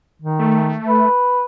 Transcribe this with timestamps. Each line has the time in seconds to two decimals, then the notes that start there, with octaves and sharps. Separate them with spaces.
0.22 D#3
0.39 A3
0.88 B4